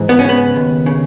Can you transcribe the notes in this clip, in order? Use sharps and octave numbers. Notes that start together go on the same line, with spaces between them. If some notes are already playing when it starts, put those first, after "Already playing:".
Already playing: G#2 E3
B3
C#4
C#3 B3
D#2
C#3